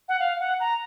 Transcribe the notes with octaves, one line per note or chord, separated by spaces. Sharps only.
F#5
F5
F#5
A#5